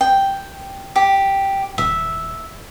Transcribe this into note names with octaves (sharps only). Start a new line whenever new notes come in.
G5
G4
D#1 E5